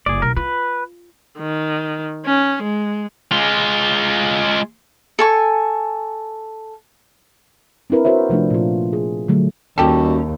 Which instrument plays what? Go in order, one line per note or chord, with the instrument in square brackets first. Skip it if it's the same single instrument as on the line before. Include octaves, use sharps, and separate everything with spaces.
[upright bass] F#1 [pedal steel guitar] G#4 D5
[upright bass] B1 [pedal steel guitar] A#4
[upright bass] F4 [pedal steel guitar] B4
[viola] D#3
C#4
G#3
[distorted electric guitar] G#3 F4
[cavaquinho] A4 G#5 C#6
[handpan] C4 D4 E4 A#4 B4
F#4 A#4 C5 C#5 E5
C3 F3 A3 D4
A#2 F4
G#4
D3 F#3 A3
[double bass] D#2 [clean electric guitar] G3 C#4 D4 [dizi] F#4 [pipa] G4 A4